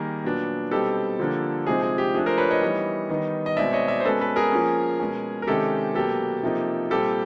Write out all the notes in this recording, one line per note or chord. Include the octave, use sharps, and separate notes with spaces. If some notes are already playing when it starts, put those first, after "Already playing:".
Already playing: D#3 G3 A#3 G#4 A#4
A#2 F#3 B3 D4
B2 G3 C4 D#4 G4 A4
D3 F3 A#3 D4
C3 F3 G#3 C4 D#4 G#4
G#4
G4
F3 A3 D4 G#4
A#4 C5
B4 C#5
C#5 D#5
E3 G3 B3 D#4
D#3 G3 B3 D#4
D#5
B2 G#3 C4 D#4 D5 E5
C#5 D#5
D5 E5
C5
B2 G#3 C#4 A4 B4
A4 B4
G#4 A#4
F3 A#3 C#4
B2 G#3 C#4
A#4
C3 D#3 G#3 C#4 G4 A4
B2 F#3 A#3 G4 A4
C3 F3 A#3 D#4
A#2 G3 C4 G4 A4